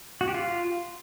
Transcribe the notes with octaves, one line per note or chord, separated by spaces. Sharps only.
F#4
G4
F4